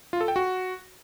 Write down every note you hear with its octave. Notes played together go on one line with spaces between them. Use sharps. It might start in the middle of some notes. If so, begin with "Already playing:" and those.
F4
A4
G5
F#4